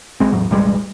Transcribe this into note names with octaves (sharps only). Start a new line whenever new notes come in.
A#1 G#3 C4
E2 A2 F#3
E1 A1 G3 G#3